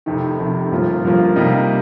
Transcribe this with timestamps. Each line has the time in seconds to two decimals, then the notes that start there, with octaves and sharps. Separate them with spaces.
0.06 F1 F2 C3 D#3
0.38 F1 F2 C3 D#3
0.71 G1 G2 F3 A#3 F4
1.04 G1 G2 F3 A#3 F4
1.36 C3 G3 A#3 D#4